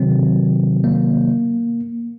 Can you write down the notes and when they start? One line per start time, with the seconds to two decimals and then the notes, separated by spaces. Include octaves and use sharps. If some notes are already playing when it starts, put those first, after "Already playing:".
Already playing: C3 D#3 F#3 C4
0.84 A#3